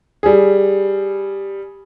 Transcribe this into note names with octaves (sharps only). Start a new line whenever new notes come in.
G3 G#4